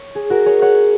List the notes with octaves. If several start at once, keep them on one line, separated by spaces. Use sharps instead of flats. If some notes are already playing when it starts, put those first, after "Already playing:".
Already playing: C#5
G#4
F#4 A#4
G#4 C#5
C#5 F#5